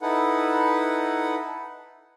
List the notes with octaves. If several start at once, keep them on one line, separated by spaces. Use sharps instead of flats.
D#4 E4 A4 B4 F#5